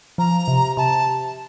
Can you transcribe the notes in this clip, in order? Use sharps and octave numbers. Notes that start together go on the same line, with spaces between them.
F3 A#5
C3
C3 A5